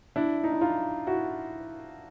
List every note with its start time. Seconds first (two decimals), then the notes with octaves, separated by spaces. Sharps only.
0.16 D4 E4
0.44 D#4
0.52 E4
0.61 D#4 F4
1.07 E4 F#4